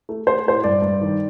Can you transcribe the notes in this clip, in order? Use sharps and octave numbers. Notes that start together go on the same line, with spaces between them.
A3
A3 C5
A2 C5
G2 D5
G2
D#3